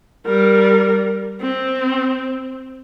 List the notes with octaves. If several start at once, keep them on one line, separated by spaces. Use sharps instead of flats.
G3 A#4
C4